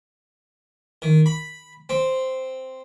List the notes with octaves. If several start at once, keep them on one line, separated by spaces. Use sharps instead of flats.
D#3
B5
C4